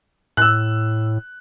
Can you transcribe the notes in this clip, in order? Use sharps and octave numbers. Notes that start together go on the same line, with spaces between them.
A2 E6 F#6